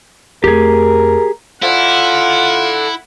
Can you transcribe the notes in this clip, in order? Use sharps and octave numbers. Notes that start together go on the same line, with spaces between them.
F2 A3 G4 G#4 A#4
E4 F4 A4 D5 F#5